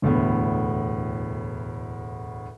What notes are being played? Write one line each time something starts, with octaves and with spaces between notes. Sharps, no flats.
E1 D2 A2 B3